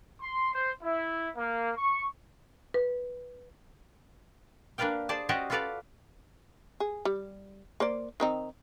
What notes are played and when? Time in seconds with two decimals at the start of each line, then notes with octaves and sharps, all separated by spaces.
0.22 C6
0.54 C5
0.84 E4
1.36 A#3
1.78 C#6
2.74 B4
4.78 A#3 D4 B4 D5 F5 G5
5.09 G#4 C5 D5 A5
5.29 C#4 F#4 G4 C5 D5 D#5
5.50 F4 F#4 A4 B4 D5 F5
6.80 G#4
7.05 G3
7.80 A#3 C5 D5
8.20 D#3 C4 D#4